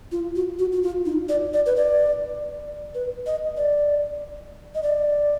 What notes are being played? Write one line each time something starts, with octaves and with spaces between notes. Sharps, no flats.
F4
F#4
F#4
F#4
F4
D#4
D5
D5
B4
D5
B4
D#5
D5
D#5
D5